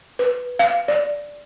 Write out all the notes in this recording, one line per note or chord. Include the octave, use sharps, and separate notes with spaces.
B4
F5
D5